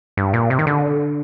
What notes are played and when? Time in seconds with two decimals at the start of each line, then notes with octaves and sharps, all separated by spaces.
0.17 G2
0.33 A#2
0.50 C3
0.59 D#3
0.67 D3